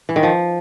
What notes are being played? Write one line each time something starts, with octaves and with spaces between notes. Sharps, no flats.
E3
D#3
F3